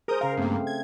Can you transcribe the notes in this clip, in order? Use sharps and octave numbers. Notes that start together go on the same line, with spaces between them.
G#4 A#4 C5 D#6 G6
C#3 A#4 F5
G2 A3 A#3 C4
A3
G#6